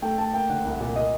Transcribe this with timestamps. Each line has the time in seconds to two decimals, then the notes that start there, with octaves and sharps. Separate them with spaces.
0.02 A3 G5
0.18 A3 A5
0.33 A#3 G5
0.50 D3 F#5
0.65 C2
0.80 A#2
0.96 A#2 D#5